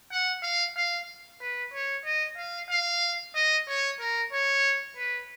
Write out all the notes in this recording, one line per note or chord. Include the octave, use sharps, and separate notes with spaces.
F#5
F5
F5
B4
C#5
D#5
F5
F5
D#5
C#5
A#4
C#5
B4